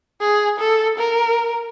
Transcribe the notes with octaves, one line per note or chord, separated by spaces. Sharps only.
G#4
A4
A#4